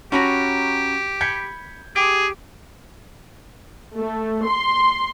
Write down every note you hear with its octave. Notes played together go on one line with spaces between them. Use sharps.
C#4 F#4 G4 A#5 B5 C#6
B5 G6 G#6 C#7
G4 G#4
A3
C6